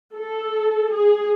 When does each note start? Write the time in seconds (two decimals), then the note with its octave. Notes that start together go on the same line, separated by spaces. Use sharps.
0.14 A4
0.90 G#4